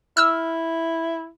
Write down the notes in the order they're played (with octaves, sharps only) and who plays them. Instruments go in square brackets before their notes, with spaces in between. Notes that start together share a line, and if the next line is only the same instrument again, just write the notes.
[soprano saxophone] E4 [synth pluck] E6 F6